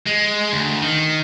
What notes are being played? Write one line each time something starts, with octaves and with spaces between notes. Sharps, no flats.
G#3
D2
D#3